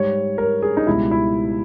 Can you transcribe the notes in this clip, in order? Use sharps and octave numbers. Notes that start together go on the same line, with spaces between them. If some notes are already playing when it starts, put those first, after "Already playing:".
Already playing: G#2 G3 C#5
A#4
G#4
D#4
C#2 B2 G3 E4
E4